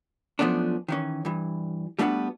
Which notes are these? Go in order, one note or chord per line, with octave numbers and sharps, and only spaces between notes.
F3 F#3 A3 B3 C#4 D4
D#3 E3 C#4
G2 E3
G3 A3 B3 D4 D#4 F#4